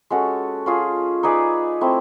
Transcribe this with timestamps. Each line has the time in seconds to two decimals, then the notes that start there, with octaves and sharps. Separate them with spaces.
0.10 G#3 C#4 F#4 A4
0.66 C#4 F4 G#4
1.23 D#4 G#4 B4 D5
1.81 A3 C4 E4